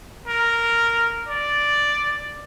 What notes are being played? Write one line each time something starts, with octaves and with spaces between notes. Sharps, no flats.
A#4
D5